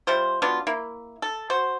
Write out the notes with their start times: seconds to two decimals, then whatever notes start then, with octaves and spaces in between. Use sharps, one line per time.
0.07 G3 E4 F4 C5
0.42 F#3 B3 D4 F4
0.67 A#3 E4
1.22 A4
1.50 F#4 C5